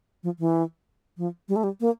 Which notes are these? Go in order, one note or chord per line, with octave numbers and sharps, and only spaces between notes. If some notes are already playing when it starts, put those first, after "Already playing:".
F3
E3
F3
G3
A3
G3
A#3